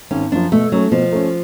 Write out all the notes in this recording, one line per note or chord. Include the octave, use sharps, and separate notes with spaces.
G#1 C#4
F#2 F3 D4
B2 A3
F#3 A3 C#4
B2 F3
A3 C#4